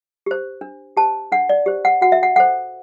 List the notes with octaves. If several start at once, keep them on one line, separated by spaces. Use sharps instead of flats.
G4 C5
D4
G4 C5 A5
D4 F#5
D5
G4 C5
F#5
F#4 F#5
E5
F#5
A4 C5 F#5